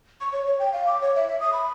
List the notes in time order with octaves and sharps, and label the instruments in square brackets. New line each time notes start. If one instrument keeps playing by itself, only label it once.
[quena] C#6
C#5
C#5
G5
F5
D6
C#5
E5
E5
D#6
B5